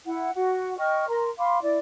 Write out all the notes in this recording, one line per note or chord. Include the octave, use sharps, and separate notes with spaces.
E4 F#5
F#4 F#5
D#5 G5 C#6 F6
A#4 A#5 C6
F5 B5 C6 D6
E4 D5